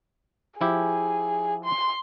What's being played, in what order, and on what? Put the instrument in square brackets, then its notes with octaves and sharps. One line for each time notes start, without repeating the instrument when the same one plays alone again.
[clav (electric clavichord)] F3 E4 G4 [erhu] G#4
[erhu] C6